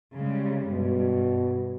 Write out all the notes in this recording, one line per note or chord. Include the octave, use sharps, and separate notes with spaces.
C#3 G3 G#3
G2 B2